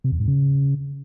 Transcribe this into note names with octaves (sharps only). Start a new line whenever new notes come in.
C3
E2
G#2
C#3